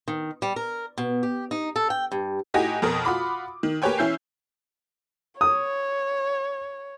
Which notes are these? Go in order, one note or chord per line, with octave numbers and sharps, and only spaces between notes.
D#3
G3
A#4
B2
G4
D#4
A4
G5
G2
A2 D#4 F#4 G4 G#5 A#6
F2 B2 A#4 D#6
F4 F#4 B5 D6
D#3
A#3 G4 B4 C#5 G5 G#5
E3 C#4 E4 G6 C7
C#5 D#6